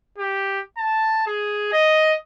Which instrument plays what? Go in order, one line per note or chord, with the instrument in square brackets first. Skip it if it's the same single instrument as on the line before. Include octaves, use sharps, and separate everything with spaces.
[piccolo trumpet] G4
A5
G#4
D#5